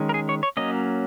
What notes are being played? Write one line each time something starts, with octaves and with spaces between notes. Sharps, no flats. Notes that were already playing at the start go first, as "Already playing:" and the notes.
Already playing: D#3 G#3 C#4
A#4
G#4
C#5
C#5
F#3 A#3 C#4 D#5